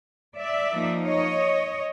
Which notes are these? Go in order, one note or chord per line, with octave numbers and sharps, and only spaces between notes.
D5 E5
F3 A#3 D#4
C#5 D#5